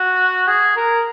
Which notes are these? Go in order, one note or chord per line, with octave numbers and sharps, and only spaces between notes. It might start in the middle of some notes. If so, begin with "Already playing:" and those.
Already playing: F#4
G#4
A#4